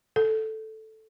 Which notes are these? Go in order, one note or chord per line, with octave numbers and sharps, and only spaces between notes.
A4